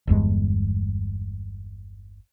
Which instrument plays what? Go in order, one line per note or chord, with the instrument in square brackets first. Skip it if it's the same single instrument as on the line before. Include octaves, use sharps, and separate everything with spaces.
[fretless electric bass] G1 E2 G2 G#3